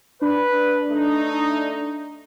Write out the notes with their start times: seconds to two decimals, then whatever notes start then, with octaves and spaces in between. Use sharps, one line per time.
0.22 D4 B4
0.88 A3 D#4